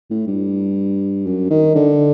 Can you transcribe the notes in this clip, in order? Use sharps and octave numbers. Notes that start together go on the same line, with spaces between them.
A2
G2
F#2
D#3
D3